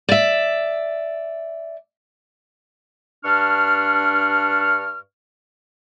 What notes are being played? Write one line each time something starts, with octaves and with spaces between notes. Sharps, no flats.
D5 E5
G2 D4 C#6 F6